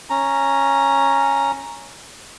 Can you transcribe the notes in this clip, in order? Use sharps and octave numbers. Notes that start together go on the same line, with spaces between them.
C#4 A#5